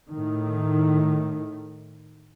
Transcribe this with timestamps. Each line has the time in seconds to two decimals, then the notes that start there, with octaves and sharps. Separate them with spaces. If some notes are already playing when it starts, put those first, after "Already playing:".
0.10 A2 D#3